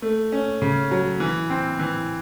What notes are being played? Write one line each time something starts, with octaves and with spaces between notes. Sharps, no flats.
A3
C#4
C#3
F#3
E3
C4
E3